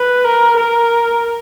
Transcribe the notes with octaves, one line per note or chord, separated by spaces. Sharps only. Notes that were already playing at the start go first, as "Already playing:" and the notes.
Already playing: B4
A#4
A#4